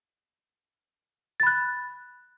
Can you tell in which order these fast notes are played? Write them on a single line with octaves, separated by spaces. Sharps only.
A6 B5 F#6